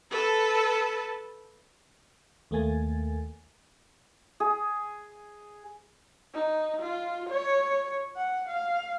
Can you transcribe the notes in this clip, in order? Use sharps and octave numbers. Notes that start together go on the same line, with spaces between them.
A4 B4 A5
D#2 A3 A#3 G#5 A6
G#4
D#4
F4
C#5
F#5
F5